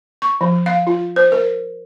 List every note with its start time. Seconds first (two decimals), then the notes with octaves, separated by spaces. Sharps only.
0.22 C#6
0.41 F3
0.66 F5
0.87 F4
1.16 C5
1.32 A#4